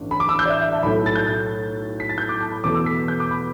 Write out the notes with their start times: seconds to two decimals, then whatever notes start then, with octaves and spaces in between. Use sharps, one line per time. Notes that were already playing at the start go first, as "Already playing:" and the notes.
Already playing: A1 G2 D3
0.11 B5
0.20 D6
0.29 E6
0.39 G6
0.45 D5
0.50 E5
0.61 E5
0.72 A5
0.83 B1 A2 A3 B5
1.06 A6
1.15 G6
1.27 A6
2.00 B6
2.09 A6
2.18 G6
2.29 D6
2.41 A5
2.52 B5
2.64 E2 B2 A3 D6
2.74 E6
2.86 B6
3.08 G6
3.20 D6
3.31 B5